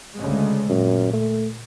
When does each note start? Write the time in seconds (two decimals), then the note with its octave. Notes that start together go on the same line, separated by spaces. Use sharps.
0.16 D2 C#3 G#3
0.69 F#2 A#2
1.13 A3